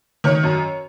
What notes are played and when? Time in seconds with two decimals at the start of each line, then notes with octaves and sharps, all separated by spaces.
0.24 D#3 C#5
0.43 F#2